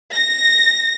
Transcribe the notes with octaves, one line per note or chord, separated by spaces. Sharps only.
A#6